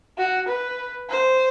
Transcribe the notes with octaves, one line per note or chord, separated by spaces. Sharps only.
F#4
B4
C5